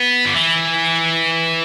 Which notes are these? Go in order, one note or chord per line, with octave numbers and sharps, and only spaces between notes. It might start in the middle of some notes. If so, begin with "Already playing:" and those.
Already playing: B3
D3
E3